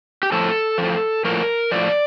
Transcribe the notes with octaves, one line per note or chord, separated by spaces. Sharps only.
G4
A2 F3 A4
A2 F3
A2 F3 A#4
A2 F3 D5